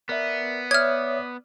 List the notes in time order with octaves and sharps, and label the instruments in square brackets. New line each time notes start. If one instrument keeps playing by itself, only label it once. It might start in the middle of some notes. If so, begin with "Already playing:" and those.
[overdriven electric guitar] B3 [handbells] A#4 D5 E5
[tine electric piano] C#5 E5 [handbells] D5 D6 D#6 [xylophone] F6 G#6